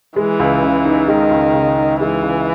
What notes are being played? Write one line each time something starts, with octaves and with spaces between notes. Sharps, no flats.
E3 G#3
C#2
C#3
D#4
D#3 G#3
C#2
C#3
D#4
E3 G#3
C#2